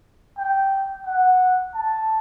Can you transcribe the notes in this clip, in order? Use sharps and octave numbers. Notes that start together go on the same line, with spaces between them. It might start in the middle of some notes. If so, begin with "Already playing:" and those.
G5
F#5
A5